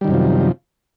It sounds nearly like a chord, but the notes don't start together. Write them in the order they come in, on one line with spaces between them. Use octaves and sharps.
G3 D#3 F#2 C3 F3